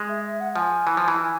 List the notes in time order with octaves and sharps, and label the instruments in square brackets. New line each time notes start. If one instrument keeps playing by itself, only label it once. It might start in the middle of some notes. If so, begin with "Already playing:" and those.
Already playing: [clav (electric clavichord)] G#3
[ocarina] E5
E5
F#5
[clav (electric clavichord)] F3 [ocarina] G#5
[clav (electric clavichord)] E3
F3
E3
[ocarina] G#5